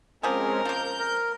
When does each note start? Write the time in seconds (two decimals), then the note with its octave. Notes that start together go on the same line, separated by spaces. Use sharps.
0.23 F3 G#3 C4 C#4 G4 G#4 A#4
0.65 F3 A#3 G6
0.99 A#4